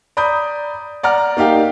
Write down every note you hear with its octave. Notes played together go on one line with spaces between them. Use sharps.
D5 A#5 B5 D#6 G6
D5 F#5 A#5 F6
A#3 D#4 G4 F5 G5